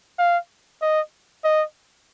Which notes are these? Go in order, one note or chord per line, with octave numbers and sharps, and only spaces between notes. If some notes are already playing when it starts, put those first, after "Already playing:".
F5
D#5
D#5